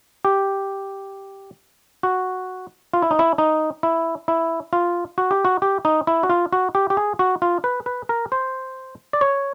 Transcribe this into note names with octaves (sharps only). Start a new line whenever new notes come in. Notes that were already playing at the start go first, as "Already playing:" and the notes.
G4
F#4
F4
E4
D#4
E4
D#4
E4
E4
F4
F#4
G4
F#4
G4
D#4
E4
F#4
F4
F#4
G4
G4
G#4
F#4
F4
B4
B4
A#4
C5
D5
C#5